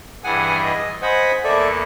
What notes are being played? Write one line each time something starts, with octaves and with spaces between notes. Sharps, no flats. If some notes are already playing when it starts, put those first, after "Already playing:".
G2 E3 G#4 F#5 G#5
D#5
C5 D#5 F#5 G#5 B5
E2 A#3 A4 D5 E5